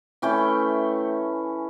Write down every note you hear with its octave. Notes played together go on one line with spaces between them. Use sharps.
E3 A3 C#4 G5